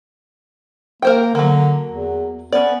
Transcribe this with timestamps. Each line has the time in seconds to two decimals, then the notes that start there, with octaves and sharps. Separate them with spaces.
1.02 A#3 A#4 C5 G5
1.35 D3 F#3 A#3
1.92 E2
2.52 B3 C#4 D5